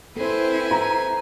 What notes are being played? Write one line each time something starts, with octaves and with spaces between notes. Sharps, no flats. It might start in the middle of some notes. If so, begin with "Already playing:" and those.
C4 E4 A4 B4 C5 G#5
A#5